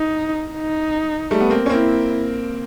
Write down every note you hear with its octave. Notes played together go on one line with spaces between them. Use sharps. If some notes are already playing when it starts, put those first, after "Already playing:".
Already playing: D#4
D#4
G3 A3
B3
A#3 C4
C#4
A#3 C4 E4